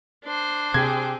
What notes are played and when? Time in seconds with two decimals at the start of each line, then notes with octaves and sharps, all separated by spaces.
0.24 D4 C5
0.74 C3 C4 G4 G#4 G#6